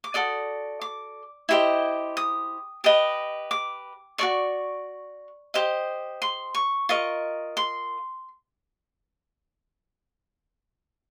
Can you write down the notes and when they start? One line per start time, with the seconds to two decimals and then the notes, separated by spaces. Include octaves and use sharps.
0.04 D6
0.14 F#4 A4 D5 D#6
0.82 D6
1.49 E4 G4 C5 D#5
2.17 D#6
2.84 G4 B4 D#5 D#6
3.51 D6
4.18 F#4 A4 D5 C#6
5.54 G4 C5 D#5
6.22 C6
6.55 C#6
6.89 F4 A#4 D#5 C#6
7.57 C6